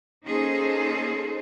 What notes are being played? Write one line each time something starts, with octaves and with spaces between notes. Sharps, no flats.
A#3 C#4 D#4 G#4 A4 C5